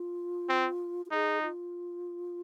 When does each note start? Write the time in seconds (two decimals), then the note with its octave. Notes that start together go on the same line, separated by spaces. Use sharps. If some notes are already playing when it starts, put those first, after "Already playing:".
Already playing: F4
0.49 C4
1.06 F4
1.11 D#4 G#4
1.42 F4